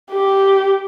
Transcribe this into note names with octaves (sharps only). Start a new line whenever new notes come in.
G4